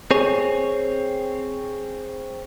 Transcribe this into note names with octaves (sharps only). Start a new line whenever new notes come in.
C4 G#4 C#5